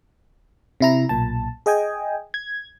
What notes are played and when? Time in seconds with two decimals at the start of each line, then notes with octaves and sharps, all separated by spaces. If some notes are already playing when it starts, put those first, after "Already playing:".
0.80 C3 E4 A#5
1.09 B1 A#2 A5
1.66 G#4 D#5 G5 G#5
2.34 G#6